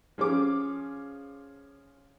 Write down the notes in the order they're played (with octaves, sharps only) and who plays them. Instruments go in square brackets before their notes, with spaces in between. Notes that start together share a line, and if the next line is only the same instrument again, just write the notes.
[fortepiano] F3 C#4 G#4 D6